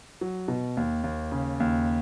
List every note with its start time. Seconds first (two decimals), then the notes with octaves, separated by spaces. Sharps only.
0.21 F#3
0.48 B2
0.77 D#2
1.04 D#2
1.32 C#3
1.60 D#2